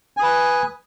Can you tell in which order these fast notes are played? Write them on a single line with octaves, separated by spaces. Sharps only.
G#5 D#6 B4